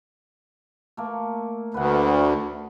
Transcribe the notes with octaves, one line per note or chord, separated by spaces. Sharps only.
A3 A#3
D2 B4 F#5